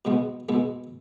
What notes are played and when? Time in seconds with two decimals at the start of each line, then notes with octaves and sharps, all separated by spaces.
0.05 B2 G#3 B3
0.49 B2 G#3 B3